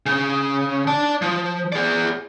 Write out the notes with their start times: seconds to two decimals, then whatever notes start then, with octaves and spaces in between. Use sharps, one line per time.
0.06 C#3
0.87 D5 A5
1.22 F3
1.72 G#4 D5